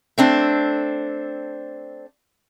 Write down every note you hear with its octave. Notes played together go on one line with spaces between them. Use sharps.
A3 C4 D4